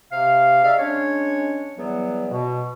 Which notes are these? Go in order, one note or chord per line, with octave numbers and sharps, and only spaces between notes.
C3 F5
D#4 G#4 D5 E5 F5
G#3 C#4 D4 C#5
E2 F#3 G3 B3
B2